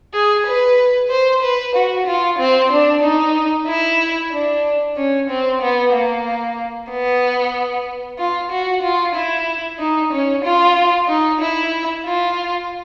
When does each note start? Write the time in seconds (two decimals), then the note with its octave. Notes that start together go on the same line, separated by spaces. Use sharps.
0.14 G#4
0.46 B4
1.10 C5
1.42 B4
1.75 F#4
2.07 F4
2.39 C4
2.72 D4
3.04 D#4
3.67 E4
4.32 D4
4.97 C#4
5.30 C4
5.61 B3
5.93 A#3
6.90 B3
8.18 F4
8.51 F#4
8.83 F4
9.15 E4
9.79 D#4
10.12 C#4
10.44 F4
11.08 D#4
11.41 E4
12.05 F4